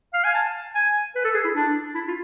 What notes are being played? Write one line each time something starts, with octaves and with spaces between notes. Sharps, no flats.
F5
G#5
A5
G#5
B4
A4
G#4
E4
D4
E4
F4